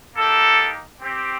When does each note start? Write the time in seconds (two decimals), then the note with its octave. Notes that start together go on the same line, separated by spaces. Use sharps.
0.16 A#3 D#4 G4 A4
1.01 C4 G4